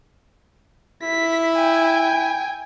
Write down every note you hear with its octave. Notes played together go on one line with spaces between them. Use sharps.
E4 B6
G5 G#5